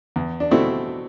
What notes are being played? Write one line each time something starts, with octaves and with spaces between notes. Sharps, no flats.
E2
D4
B2 A3 C4 E4